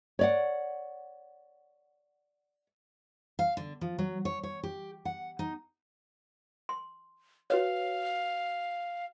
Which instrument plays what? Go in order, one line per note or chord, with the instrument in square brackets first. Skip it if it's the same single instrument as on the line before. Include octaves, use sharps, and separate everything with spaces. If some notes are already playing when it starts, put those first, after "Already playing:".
[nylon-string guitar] C#5 D5 F#5
[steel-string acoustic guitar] F5
D3
F3
F#3
C#5
C#5
G4
F#5
D#4
[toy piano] C6
[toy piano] F#4 B4 C#5 [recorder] F5